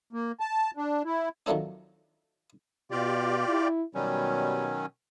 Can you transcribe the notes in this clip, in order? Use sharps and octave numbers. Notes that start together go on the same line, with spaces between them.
A#3
A5
D4
E4
D#3 F3 F#3 A3 C4 D4
B2 F4 G4 D5
E4
B2 D#3 F#3 G3 C#4